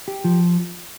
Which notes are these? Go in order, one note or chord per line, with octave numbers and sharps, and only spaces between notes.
G4
F3